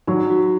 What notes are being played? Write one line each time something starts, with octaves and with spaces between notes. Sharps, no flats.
F#3 D#4
F#4